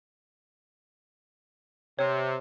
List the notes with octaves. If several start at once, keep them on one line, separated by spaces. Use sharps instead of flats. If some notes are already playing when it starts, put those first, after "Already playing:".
C3 C#5